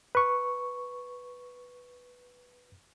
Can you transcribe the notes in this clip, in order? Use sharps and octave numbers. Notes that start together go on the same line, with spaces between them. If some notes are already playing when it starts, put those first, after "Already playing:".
B4 C#6